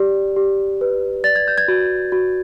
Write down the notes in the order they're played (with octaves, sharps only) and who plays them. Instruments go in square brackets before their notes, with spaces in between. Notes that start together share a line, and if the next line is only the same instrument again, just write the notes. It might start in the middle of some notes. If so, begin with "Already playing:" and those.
Already playing: [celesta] G4 D5
G4
B4
D5 A6
G#6
G6
G#6
F#4
F#4